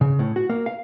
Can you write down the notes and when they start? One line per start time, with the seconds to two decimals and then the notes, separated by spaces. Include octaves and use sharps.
0.01 C#3
0.19 A2
0.36 F#4
0.49 A#3
0.66 F5